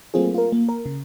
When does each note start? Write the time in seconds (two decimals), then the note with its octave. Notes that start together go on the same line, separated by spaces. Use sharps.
0.14 F#3 A3 A#3 C4 F4 G#4
0.34 F4 A#4
0.52 A#3
0.69 A#4
0.86 C#3